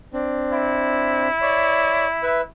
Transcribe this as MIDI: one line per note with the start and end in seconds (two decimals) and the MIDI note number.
0.13 1.28 60
0.13 1.28 62
0.53 2.47 64
1.42 2.06 73
1.42 2.06 74
2.23 2.41 71
2.23 2.41 76